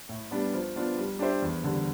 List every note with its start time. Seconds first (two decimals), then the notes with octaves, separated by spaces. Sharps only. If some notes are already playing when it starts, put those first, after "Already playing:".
0.09 A2
0.31 G3 B3 D4
0.54 F3
0.76 B3 D4 F4
0.98 G3
1.19 D4 G4 C5 E5
1.42 E2
1.64 D3 G3